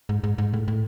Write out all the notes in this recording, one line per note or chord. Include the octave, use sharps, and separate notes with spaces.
G#2
G#2
G#2
A2
A2